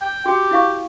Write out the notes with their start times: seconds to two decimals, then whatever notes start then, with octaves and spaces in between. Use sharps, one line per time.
0.01 G5
0.26 F#4 G4 G5
0.51 E4 F5 C#6